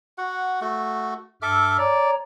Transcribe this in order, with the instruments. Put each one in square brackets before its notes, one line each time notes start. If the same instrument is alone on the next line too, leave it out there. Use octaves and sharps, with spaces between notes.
[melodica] F#4 F#5
A3 F#4
[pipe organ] G2 F6 [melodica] A4 E5 D6
[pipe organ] C#5 A#5 [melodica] D5